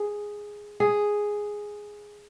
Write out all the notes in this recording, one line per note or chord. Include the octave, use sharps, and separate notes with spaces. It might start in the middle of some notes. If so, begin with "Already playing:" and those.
Already playing: G#4
G#4